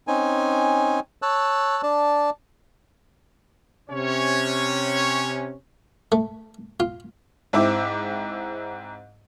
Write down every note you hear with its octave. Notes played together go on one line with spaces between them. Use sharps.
C4 C#4 D#4 G#5
C#5 A5 E6 F#6
D4 D5 A5
C3 C#4 C#5
A3
F4
G#2 C4 E4 E5 D6